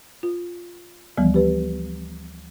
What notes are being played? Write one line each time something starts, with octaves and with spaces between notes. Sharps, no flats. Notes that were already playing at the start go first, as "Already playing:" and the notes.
F4
D2 E3 F3 G3 B3
G4 B4